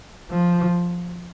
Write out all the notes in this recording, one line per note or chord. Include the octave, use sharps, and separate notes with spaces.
F3